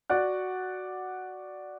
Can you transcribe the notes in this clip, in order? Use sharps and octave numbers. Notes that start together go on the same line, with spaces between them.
F#4 D5 F#5 F#6